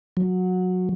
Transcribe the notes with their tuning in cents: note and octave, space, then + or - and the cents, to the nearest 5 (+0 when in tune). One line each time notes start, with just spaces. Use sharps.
F#3 -15